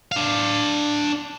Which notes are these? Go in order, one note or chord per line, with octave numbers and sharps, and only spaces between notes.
D4 F5